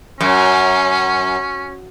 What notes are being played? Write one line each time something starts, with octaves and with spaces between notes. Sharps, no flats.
F#2 C#4